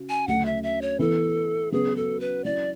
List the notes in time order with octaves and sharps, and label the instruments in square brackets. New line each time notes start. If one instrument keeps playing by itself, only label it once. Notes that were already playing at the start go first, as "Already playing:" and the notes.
Already playing: [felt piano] C#3 F#4
[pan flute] G#5
[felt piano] D2 C#3 F#3 A3 C#4 [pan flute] F#5
[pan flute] E5
E5
C#5
[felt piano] E3 B3 E4 B4 [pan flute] A4
[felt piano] C#3 F#3 B3 F#4 B4 [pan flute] G#4
[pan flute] A4
B4
[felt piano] F#3 C#4 E4 [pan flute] D5